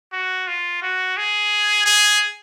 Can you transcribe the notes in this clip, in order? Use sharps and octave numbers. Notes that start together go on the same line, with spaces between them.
F#4
F4
F#4
G#4
G#4